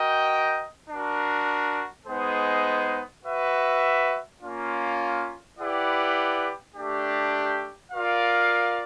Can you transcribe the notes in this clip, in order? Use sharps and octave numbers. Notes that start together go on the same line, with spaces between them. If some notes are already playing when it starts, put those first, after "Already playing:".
Already playing: F#4 A#4 D#5 G5
D4 F#4 A#4
G#3 B3 D#4 G#4 C5
F#4 B4 E5
A#3 C#4 F4
E4 G4 B4 D5 F#5
A3 D4 G4
F4 A#4 D5 F5